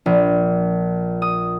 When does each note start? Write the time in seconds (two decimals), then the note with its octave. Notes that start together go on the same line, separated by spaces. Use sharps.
0.06 A#1
1.22 D#6